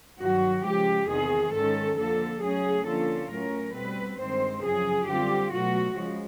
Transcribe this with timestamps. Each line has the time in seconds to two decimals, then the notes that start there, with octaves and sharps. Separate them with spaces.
0.20 G2 D#3 F#3 F#4
0.64 C#3 F3 G#3 G4
1.08 E2 C3 D#3 G#4
1.53 G#2 D#3 G#3 C#4 A4
1.98 F2 D3 F3 A#3 A4
2.42 F#2 C#3 F#3 A3 C#4 G#4
2.85 D3 F3 A#3 C#4 F4 A4
3.30 A2 F#3 A3 C#4 A#4
3.75 B2 G3 C4 B4
4.19 G2 D#3 G#3 C4 C5
4.63 F#2 C#3 F3 G#4
5.07 D3 G3 C4 F4 G4
5.52 B2 F#3 A3 F#4
5.96 C#3 F3 G#3